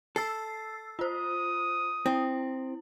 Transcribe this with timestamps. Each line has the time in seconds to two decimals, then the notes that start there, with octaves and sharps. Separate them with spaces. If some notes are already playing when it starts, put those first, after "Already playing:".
0.16 A4 E6 A6 C7
0.99 F4 C5 D#6
2.06 C4 E4